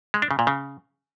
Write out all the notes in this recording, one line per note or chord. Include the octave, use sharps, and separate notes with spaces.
G#3
D4
C#3
A#2
C#3